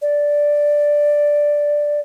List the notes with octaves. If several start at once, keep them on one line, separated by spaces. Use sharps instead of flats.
D5